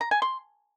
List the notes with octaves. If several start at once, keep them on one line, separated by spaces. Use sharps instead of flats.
A#5
G#5
C6